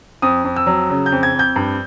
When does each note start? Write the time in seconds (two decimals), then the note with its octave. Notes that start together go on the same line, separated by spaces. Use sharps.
0.22 F2 D#6
0.44 F2
0.56 E6
0.67 F#3
0.90 C#3
1.06 G6
1.12 F2
1.23 G#6
1.34 F2 G6
1.56 G2